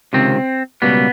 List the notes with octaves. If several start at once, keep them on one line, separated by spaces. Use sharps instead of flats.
C#2 C3 D#3 C4
C#2 B2 G3 A#3 B3